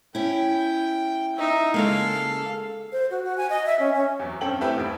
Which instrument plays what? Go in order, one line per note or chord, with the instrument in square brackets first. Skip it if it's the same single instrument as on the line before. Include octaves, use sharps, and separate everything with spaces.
[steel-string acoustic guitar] C#4 E4 [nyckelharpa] G5
[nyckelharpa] D#4 E5
[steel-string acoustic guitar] C#3 G#3 A#3 [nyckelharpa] A4 F5
[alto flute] C5
F#4
F#4
G#5
D#5
E5
C#4
C#4
[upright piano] E2 F#3
G2 C4 C#4 A4 G5 F#7
A3 C4 E4 G4 B4
D#1 D#2 D7